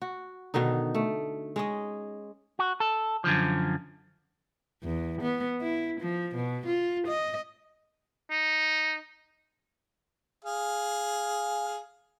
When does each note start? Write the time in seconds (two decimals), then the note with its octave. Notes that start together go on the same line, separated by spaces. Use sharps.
0.02 F#4
0.54 B2 D3 D#3 D#4
0.95 A3
1.56 G#3 C#4 D#5
2.59 F#4
2.80 A4
3.24 F#2 D3 F3
4.83 E2
5.22 B3
5.61 E4
6.00 F3
6.35 B2
6.66 F4
7.07 D#5
8.31 D#4
10.45 G#4 F5